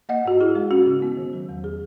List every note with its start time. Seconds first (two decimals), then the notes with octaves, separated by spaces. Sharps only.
0.09 A#3 D#5 F#5
0.25 G#2 F#4
0.41 E4 G#4
0.55 G#3
0.71 C#4 F#4
0.86 C#3
1.02 B3
1.17 D#3
1.33 F#3
1.49 E2
1.64 G#4